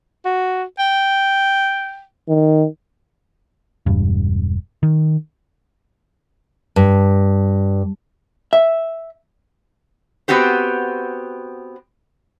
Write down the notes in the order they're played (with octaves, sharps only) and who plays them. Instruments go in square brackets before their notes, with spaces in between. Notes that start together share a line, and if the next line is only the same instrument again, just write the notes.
[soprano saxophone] F#4
G5
[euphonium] D#3
[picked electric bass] E1 G2
D#3
[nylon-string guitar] G2
[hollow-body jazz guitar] E5
[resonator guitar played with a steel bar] B3 C4 F#4 G4 C5